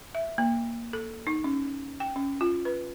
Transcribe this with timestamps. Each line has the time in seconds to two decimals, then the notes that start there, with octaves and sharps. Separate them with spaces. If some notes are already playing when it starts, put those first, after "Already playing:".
0.15 E5
0.38 A#3
0.93 A4
1.27 D#4
1.44 C#4
2.00 G5
2.16 C#4
2.41 F4
2.65 B4